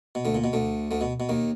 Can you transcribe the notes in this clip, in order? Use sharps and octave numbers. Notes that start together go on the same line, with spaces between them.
B2
D2 D3
A#2
B2
D2 D3
D2 D3
B2
B2
D#2 D#3